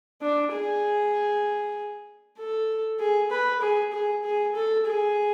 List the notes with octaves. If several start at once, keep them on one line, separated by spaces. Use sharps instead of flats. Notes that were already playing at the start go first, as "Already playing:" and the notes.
D4
G#4
A4
G#4
B4
G#4
G#4
G#4
A4
G#4